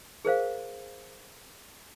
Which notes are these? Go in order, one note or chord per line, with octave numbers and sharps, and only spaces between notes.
G#4 A#4 C5 F5